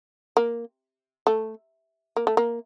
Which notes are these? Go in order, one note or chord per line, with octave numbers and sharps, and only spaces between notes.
A#3
A3
A#3
A3
A#3